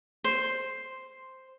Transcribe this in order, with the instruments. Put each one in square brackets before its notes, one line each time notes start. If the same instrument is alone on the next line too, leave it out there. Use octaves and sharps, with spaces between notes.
[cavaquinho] C5